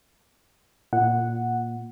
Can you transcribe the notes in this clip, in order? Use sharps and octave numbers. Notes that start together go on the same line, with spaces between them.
A#2 F#5